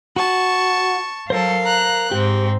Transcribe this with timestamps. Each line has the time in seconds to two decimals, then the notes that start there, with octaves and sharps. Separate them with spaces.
0.16 F#4 A5 C#6
1.30 F#3 A4 A#4 C5 F5
1.63 A#5 F#6
2.12 G#2 C4 G4